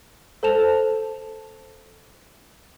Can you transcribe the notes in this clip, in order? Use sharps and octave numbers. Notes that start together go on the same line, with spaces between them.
A4 C5 A5 E7 F7